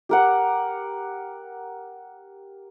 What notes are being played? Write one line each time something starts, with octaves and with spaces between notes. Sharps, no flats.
G4 A#4 F#5